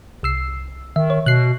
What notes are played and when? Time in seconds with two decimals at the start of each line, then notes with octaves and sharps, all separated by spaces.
0.23 C2 E6 C7
0.96 D#3 E5
1.10 C#5
1.26 B2 F#6 C7